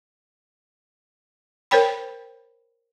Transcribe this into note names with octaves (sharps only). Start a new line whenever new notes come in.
A#4 C5 C#5 G5 B5